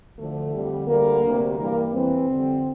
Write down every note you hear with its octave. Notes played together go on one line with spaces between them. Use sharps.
D2 D3 F3 A3
F2 D3 G3
D2 D3 G3 A#3
D2 C3 G3
G2 E3 G3 A#3
E2 C3 E3 G3 C4
F2 D3 G3